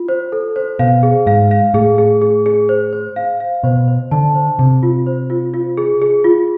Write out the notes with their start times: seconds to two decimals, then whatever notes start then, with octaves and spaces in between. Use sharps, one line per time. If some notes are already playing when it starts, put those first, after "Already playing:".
Already playing: F4
0.09 C5
0.32 A4
0.56 C5
0.79 B2 F5
1.03 G#4
1.26 G#2 F5
1.51 F5
1.74 A2 G#4
1.98 G#4
2.22 G#4
2.46 G#4
2.69 C5
2.93 C5
3.16 F5
3.40 F5
3.63 B2 C5
3.88 C5
4.11 D3 A5
4.35 C5
4.59 C3 C5
4.83 F4
5.07 C5
5.30 F4
5.54 F4
5.78 G#4
6.02 G#4
6.24 F4